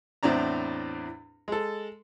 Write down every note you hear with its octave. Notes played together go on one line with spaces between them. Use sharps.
E2 A2 C4 D4 A#5
G#3 A4